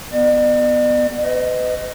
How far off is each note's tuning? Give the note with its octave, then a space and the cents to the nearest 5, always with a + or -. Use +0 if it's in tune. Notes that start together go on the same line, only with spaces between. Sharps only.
B3 +0 D5 +45
B4 +40 D#5 +0